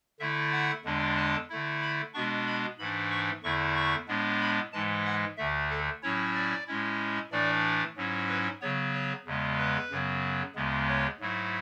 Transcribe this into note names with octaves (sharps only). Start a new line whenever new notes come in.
D3 A3 E4 E5
F#5
E2 D3 G#3 D4
A5
D3 A3 E4
B5
B2 G#3 B3 D4 C#6
B5
G#2 E3 A3 D4 B5
C#6
E2 D3 A3 E4 C#6
C#6
A2 G#3 B3 D4
B5
G#2 E3 G#3 A5
F#5
D2 D3 A3 E5
A4
A2 F#3 C#4 E4 C#5
D5
A2 G#3 C#4 E4
A2 E3 A3 D4 D5
G#2 F#3 C#4 E4
B4
C#3 F#3 B3 C#5
C#5
E2 C#3 G#3 B3
B4
F#2 C#3 F#3 B3
D2 C#3 G#3 B3
C#5
G#2 F#3 A3 E4